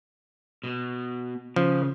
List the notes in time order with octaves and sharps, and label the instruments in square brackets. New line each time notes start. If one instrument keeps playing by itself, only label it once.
[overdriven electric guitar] B2
[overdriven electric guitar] C#3 [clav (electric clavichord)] F3